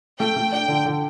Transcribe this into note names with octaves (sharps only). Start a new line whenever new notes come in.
A3 G5
A3
D4 G5
D3
D3